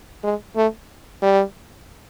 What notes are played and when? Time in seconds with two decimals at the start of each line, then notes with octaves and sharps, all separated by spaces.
0.24 G#3
0.56 A3
1.22 G3